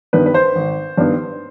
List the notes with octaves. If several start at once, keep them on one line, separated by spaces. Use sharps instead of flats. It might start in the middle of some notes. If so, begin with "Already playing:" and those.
G2 D#3 B3 B4
B4
C5
G#1
G2 D#3 B3